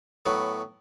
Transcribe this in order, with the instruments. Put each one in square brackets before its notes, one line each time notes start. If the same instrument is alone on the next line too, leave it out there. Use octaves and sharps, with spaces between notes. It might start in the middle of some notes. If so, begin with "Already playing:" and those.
[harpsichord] A2 F#3 B3